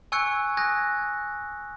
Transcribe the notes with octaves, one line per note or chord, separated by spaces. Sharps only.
G#5 C#6 E6 F#6 G#6 C#7
G#5 D#6 F#6 G#6 A#6